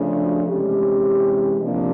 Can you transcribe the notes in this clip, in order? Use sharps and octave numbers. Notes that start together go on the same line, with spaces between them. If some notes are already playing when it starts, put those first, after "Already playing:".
Already playing: C#3 F3 A3 D4
F#4
C3 E3 G#3 C#4 G4
C3 F3 A#3 D4